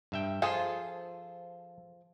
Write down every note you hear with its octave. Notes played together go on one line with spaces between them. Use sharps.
G2 E5 G5
F3 F4 G#4 A4 C5